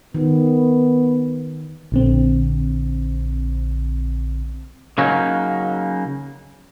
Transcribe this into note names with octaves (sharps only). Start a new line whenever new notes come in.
D#3 B3
A#1 D3 C4
C#3 F#3 A#3 C#4 D#4